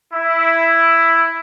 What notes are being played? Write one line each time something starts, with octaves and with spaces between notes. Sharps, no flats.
E4